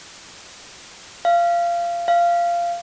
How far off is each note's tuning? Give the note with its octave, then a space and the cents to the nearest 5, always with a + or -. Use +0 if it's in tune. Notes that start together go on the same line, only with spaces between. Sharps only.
F5 -20
F5 -15